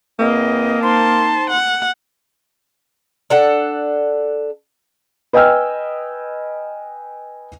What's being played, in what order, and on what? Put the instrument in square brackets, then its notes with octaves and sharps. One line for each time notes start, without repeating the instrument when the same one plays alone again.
[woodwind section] E2 C4 D#5 [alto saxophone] A#3
[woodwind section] C4 D#4 C6 [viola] A5
[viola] F#5
[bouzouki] D4 A4 F#5
[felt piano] B4 D#5 G5 G#5 E6 F6